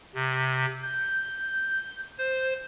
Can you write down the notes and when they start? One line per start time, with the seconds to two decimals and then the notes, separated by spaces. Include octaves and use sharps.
0.15 C3
0.83 G6
2.18 C5